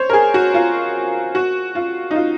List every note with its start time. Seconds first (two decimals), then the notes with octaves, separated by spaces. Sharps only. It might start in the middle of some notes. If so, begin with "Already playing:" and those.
Already playing: C5 C#5
0.10 A#4
0.13 G#4
0.34 F#4
0.54 F4
1.35 F#4
1.75 F4
2.11 D#4
2.16 F4